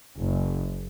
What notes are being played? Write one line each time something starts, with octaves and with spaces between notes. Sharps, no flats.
F#1